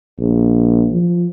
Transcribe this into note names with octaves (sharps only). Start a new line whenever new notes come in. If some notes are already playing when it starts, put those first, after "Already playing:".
A#1
F3